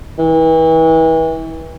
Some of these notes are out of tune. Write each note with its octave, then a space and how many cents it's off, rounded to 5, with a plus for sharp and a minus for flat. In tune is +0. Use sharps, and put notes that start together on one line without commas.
E3 -35